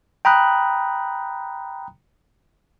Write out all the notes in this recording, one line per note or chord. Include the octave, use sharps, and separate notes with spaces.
G5 A#5 B5 D#6 F#6